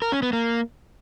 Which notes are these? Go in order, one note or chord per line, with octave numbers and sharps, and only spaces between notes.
A#4
C#4
B3
A#3